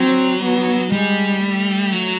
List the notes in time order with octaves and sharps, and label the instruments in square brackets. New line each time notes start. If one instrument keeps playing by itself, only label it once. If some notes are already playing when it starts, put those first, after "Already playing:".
Already playing: [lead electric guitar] F#3 [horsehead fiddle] C4
[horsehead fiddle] B3
[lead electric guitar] G3 [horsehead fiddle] G#3
[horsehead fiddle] A3
[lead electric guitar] F#3